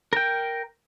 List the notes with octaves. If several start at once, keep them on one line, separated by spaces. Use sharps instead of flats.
A#4 G5